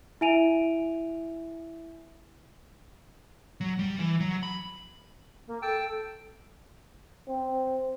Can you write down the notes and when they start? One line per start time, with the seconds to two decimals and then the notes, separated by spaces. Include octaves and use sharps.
0.21 E4 E5 G#5 D7 D#7 F7
3.61 F#3
3.79 G3
4.00 E3
4.20 F#3
4.43 B5
5.47 A#3
5.62 A4 G5 A5 E6
7.28 C4